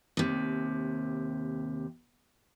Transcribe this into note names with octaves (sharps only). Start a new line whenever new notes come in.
D#2 C3